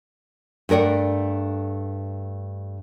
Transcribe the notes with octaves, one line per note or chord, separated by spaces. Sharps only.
G2 A3 A#4 D5 F#5